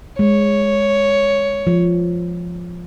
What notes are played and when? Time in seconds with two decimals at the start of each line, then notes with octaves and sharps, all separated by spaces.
0.19 G#3 C#5
1.67 F3